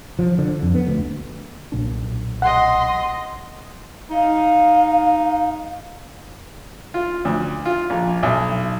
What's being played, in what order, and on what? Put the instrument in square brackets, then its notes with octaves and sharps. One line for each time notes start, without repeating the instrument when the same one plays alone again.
[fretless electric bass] F3
D3
F2
B3
D2
[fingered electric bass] B1 A#2 D4
[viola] D#5 C6 [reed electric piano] F#5
[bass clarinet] D#4 [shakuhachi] F5
[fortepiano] F4
D2
F4
A#1
B1